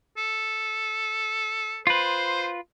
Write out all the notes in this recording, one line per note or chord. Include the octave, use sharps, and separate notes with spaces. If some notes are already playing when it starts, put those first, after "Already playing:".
A4
F4 B4 C5